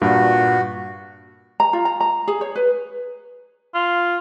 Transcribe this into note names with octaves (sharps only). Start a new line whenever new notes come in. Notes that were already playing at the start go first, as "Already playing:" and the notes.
G2 A#2 F#4
A#5
F4
A#5
A#5
G#4
C#5
B4
F4